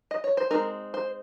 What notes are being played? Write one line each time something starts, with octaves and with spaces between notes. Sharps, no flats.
D#5
C#5
C5
G#3 C4 D#4 A#4
C5